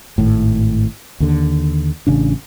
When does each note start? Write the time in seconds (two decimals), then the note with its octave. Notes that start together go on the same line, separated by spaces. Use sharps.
0.18 G#1 A2
1.20 D#2 D3
2.07 A1 C#3 D4